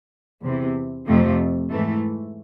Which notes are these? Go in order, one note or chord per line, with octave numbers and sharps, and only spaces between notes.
E2 C3 E3
F2 C3 F3 A3
G#2 E3 A3